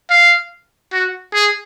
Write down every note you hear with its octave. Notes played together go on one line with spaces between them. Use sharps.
F5
F#4
G#4